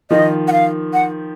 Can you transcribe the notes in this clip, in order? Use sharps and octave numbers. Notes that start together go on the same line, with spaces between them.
D#3 F3 D#5
F#5
F5
F#5